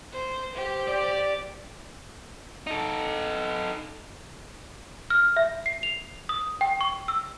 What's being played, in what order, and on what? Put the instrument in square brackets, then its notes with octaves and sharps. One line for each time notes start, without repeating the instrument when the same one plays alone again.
[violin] C5
[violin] G4 [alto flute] C5
[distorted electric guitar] D5
[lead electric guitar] D#4 A4
[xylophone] F6
E5
C7
F7
D#6
G5
C#6
E6